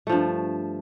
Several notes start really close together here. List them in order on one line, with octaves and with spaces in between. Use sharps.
A3 F3 G2